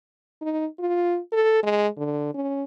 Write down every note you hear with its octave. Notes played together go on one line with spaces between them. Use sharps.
D#4
F4
A4
G#3
D3
C#4